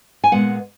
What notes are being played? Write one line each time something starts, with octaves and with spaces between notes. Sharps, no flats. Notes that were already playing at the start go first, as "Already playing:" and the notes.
G#5
A#2 G#3 B3 F#5